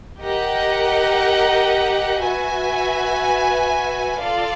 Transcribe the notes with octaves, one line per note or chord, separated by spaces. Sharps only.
G4 A#4 D#5 F#5
F#4 B4 E5 G#5
D4 F4 A4 D5 F5